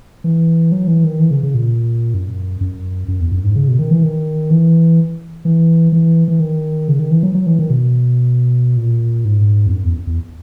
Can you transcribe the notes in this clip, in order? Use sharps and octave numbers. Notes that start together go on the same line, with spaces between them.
E3
F#3
E3
D#3
E3
C#3
C#3
A#2
F#2
F#2
F#2
E2
F#2
G#2
C#3
B2
D#3
E3
D#3
E3
E3
E3
E3
D#3
C#3
D#3
E3
F#3
F#3
E3
D#3
B2
A#2
G#2
E2
F#2
E2
E2